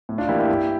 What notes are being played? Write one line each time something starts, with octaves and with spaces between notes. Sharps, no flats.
A2
D4 F4
E3 A#3 E4 G4
E4 G4
G2